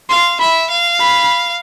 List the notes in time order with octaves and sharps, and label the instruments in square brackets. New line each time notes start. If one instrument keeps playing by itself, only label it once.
[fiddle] F5 [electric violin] C6
[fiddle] E5 [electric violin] B5
[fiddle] F5
[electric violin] B5